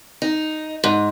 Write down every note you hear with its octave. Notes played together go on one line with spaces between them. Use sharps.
D#4
G#2